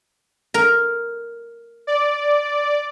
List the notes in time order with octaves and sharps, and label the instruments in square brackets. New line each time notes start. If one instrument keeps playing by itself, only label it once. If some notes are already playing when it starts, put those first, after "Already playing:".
[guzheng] A#4
[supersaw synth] D5